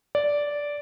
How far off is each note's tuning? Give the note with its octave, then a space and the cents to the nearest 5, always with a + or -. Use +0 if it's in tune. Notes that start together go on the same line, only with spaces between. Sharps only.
D5 -10